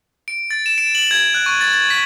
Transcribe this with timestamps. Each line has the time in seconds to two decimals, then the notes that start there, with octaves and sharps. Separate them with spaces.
0.28 D7
0.51 A6
0.66 E7
0.78 D7
0.95 F#7
1.11 G#6
1.34 F#6
1.46 C#6
1.61 A6
1.73 A6
1.90 B6